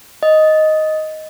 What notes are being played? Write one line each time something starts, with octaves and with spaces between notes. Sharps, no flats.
D#5